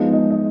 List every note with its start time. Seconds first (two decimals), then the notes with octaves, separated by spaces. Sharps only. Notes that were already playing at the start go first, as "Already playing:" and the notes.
Already playing: F3 G#3 B3 D#4
0.13 D#5
0.30 D#5